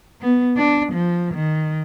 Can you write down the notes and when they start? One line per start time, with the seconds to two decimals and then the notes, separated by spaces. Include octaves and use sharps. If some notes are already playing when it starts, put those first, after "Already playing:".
0.21 B3
0.57 D4
0.93 F3
1.35 D#3